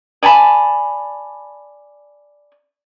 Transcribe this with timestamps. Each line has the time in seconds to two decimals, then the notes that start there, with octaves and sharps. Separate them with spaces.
0.23 D5 G#5 A5 B5